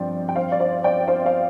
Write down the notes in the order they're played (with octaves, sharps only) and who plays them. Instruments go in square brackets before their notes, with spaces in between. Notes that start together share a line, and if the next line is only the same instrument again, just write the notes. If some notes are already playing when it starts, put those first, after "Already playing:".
Already playing: [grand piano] G2 F3 C4 [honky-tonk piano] D5 G5
[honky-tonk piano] G5
C5 F5
D5
C5 F5
D5 G5
C5 F5
C5 F5